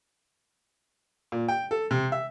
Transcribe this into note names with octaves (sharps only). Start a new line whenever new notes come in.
A#2
G5
A4
C3
E5